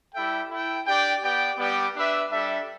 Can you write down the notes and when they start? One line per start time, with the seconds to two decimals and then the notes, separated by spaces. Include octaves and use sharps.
0.14 G3 E4 A4 E5 G5
0.49 E4 A4 G5
0.85 D4 G4 D5 G5
1.22 B3 G4 D5 G5
1.58 G3 B3 G4 D5 G5
1.94 D4 B4 E5
2.30 G3 D4 A4 E5